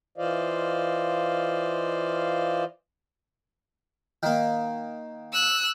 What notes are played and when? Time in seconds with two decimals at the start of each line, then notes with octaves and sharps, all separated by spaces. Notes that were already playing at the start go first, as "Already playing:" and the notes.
0.18 E3 F4 C5 D5 D#5 F5
4.23 D#3 A#3
5.33 E6 F#6